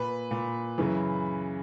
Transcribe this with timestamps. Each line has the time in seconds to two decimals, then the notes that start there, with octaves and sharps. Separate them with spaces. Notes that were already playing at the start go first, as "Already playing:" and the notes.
Already playing: A#2 B4
0.31 A#2
0.78 F#2 C#3 E3